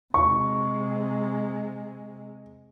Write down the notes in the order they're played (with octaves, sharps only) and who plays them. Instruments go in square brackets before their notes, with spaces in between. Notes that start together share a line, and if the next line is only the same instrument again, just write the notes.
[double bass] C3 G#3 [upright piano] C#6